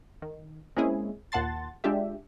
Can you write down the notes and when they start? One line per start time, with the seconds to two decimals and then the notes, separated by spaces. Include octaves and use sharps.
0.22 D#3
0.76 G#3 A#3 C4 C#4 E4 G#4
1.32 D#2 A#2 F#5 A5 C6 A6
1.84 G#3 D4 F4 G4 E5